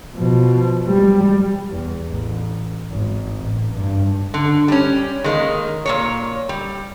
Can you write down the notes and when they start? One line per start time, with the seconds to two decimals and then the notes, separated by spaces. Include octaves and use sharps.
0.16 B2 F3
0.89 G3
1.71 E2
2.06 A1
2.92 G#1
3.41 A1
3.75 G2
4.34 D3
4.68 G3 C#4
5.24 D#3 G#3 A#3
5.85 A#2 A#3 C#5
6.49 G3